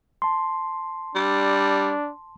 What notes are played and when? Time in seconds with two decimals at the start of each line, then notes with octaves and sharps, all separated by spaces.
0.22 A5 C6
1.15 G3 D4